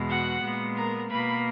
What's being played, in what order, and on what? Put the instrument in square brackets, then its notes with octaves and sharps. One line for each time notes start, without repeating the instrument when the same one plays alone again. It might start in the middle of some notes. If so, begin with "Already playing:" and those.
Already playing: [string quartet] E2 B2 G#3
F#4 F#5
A#2 G#3 B3
A#4 A#5
B2 A#3 B4 B5